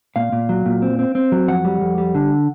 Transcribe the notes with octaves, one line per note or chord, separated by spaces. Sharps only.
A#2 F5
A#2
F#3
A#2
C4
C4
C4
F#3
F2 F#5
G3
F2
G3
D3